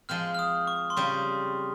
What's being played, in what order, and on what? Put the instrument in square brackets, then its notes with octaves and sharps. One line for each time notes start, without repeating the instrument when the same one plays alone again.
[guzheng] F3 G#3 C4 [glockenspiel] F6
[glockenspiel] F6
D#6
C#6
C6
[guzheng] C#3 G3 C4 [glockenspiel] C#6